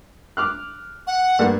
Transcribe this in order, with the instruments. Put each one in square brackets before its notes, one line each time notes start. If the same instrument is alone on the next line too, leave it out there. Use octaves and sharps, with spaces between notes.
[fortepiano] D6 F6 F#6
[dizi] F#5
[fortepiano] G2 A3 A#3